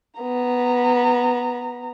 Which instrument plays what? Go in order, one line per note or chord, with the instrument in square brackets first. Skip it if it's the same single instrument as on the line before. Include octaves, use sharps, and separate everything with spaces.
[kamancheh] B3 A#5